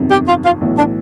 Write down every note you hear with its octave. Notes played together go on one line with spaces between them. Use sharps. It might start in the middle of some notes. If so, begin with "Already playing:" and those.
Already playing: G1 F2 C3 D#3 F#3
G4
F4
F4
B1 A2 E3
D4